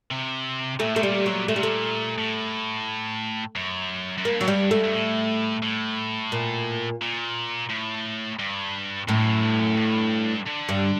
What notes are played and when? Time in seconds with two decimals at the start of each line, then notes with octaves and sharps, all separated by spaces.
0.11 C3
0.80 A#2 A3
0.87 A2
0.95 A#2 A3
1.03 G3
1.26 F#3
1.48 A#2 A3
1.56 C3 G3
1.63 A#2 A3
2.18 A2
3.56 F#2
4.18 F#2
4.25 G2 A#3
4.41 F#3
4.48 G3
4.71 A3
4.84 G2
4.94 A2
5.63 A2
6.32 A#2
7.01 A#2
7.70 A2
8.39 G2
9.08 F#2 A2
9.17 G2
9.26 F#2
9.42 G2
9.60 F#2
9.77 G2
10.46 D3
10.69 G2